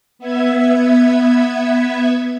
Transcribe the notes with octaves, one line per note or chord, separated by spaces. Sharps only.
B3 E5 G#6